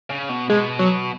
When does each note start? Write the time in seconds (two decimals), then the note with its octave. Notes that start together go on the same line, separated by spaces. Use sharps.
0.10 C#3
0.29 B2
0.50 B2 G#3
0.79 F#3